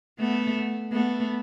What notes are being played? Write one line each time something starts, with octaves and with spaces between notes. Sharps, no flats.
A3 B3
A3 B3